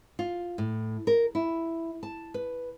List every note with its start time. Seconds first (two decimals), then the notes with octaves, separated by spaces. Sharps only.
0.19 F4
0.58 A2
1.07 A#4
1.35 E4
2.03 A5
2.34 B4